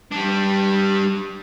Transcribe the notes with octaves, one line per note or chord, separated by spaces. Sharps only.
G3 D4